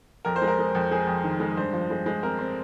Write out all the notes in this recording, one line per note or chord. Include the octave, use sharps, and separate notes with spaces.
F2 A#4
C5
G#3
A#4
G#3
F2
G#3 G#4
F2
D#3
G#3
G2 C5
F3
G#3
G#3
C4 A#4
C4